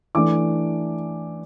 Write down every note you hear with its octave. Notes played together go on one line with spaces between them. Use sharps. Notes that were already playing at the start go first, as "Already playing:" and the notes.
E3 A3 D4 D6